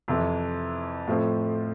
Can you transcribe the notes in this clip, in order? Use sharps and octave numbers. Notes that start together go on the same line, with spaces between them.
F2 C3 E3
A2 F3 C4